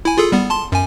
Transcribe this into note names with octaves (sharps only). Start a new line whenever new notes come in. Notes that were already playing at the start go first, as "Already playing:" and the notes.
E4 G#5
F4 G#4 A4
G3 B3
A5 C6
F#2 G#5